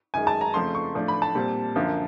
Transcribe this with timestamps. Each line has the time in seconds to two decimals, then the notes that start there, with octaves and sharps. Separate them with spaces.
0.14 F#2 D#3 G#3 G#5
0.27 A5
0.41 A#5
0.54 F2 C#3 F3 A3 C6
0.75 C#6
0.95 A2 F3 A3 D4
1.08 B5
1.22 A5
1.35 A#2 G3 C4
1.75 F#2 D3 F3 A#3